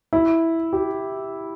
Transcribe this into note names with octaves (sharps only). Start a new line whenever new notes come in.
E4
G4